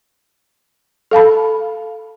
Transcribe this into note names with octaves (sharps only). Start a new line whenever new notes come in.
A4 F5 A5 B5